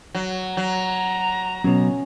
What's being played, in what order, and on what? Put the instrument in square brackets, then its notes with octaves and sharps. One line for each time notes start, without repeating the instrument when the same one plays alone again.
[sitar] F#3
[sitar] F#3 [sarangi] A#5
[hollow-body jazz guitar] B2 F#3 [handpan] C#4